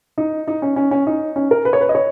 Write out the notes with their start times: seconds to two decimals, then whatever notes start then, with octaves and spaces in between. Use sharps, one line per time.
0.18 D#4
0.48 D#4
0.62 C#4
0.76 C#4
0.91 C#4
1.07 D#4
1.36 C#4
1.51 A#4
1.65 B4
1.73 C#5
1.81 B4
1.89 D#5
1.95 C#5